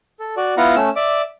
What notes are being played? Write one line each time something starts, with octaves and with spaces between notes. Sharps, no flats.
A4
F#4 D5
B3 E4 F4 F5 F#5 A#5
A3 C#4 E6
D5 E5 D6